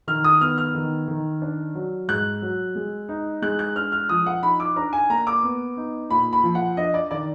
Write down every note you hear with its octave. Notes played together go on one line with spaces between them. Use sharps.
D#3 F6
D#6
B3 F6
F6
D#3
D#3
D4
F#3
G#2 F#6
F#3
G#3
D#4
G#3 F#6
F#6
D4 F6
F6
F3 D#6
F#5
D#4 B5
D6
D4 A#5
G#5
A#3 A#5
D6
B3
D#4
A#2 B5
B5
F3
F#5
D4 D#5
D5
D#3 D5